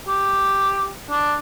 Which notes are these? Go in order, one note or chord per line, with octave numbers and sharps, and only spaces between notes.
G4
D4